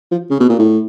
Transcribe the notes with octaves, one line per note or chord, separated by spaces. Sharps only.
F3
C#3
B2
A#2
A2